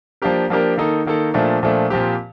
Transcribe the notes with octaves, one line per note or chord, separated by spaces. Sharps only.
F3 A#3 D4 G4 A#4
F3 A#3 D4 G4 A#4
D#3 A#3 D#4 A4
D#3 A#3 D#4 A4
A#2 F3 A3 D4
A#2 F3 A3 D4
A#2 F3 C4 G4